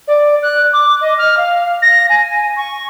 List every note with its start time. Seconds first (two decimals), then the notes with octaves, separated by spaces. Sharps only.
0.07 D5
0.42 F#6
0.73 D6
1.01 D#5
1.18 F6
1.37 F5
1.82 A#6
2.09 G#5
2.56 C#6